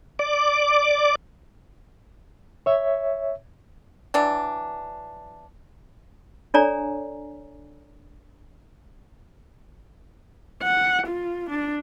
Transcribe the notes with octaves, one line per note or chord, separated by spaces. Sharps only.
D5 D6
C#5 E5
E3 F#3 D4
D4 A4 C#5 D5 G#5 A#5
F#5
F4
D4